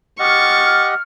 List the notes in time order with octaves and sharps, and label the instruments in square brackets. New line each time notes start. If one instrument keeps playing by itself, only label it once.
[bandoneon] G4 D#5 F#5 [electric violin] C#6 A6 [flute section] F6